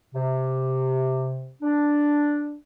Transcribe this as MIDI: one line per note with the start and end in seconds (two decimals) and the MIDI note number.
0.15 1.52 48
1.62 2.57 62